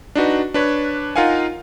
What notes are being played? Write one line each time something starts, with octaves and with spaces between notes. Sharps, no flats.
D4 D#4 F#4 B4
D4 B4 C#5
D#4 F4 A#4 F5 F#5 G#5